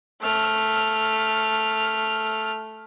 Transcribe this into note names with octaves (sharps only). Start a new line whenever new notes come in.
A3 F6